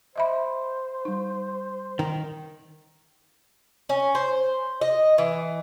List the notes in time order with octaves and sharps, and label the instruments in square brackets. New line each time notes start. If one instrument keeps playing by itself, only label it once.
[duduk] C5 [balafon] D#5 E5 B5
[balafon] G3 D#4
[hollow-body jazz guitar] D#3
[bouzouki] C#4
C5
D#5
E3